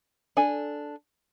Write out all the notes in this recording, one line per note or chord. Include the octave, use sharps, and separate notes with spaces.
D4 A4 G#5